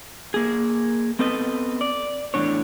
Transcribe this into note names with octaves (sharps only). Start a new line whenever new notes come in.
A#3 G#4
B3 C4 A4 B4 D#5
D5
E2 A2 D#3 D4 C#5